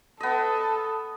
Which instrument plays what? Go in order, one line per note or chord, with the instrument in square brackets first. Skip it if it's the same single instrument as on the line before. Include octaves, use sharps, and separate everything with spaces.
[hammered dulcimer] B3 D#5 [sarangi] A4